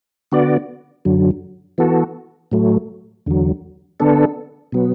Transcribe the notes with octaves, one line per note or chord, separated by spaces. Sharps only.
D3 B3 F#4 D5
F#2 D3 F#3
E3 B3 F#4 A4
A2 F#3 A3
E2 D3 F#3
D3 B3 D4 A4
B2 F#3 B3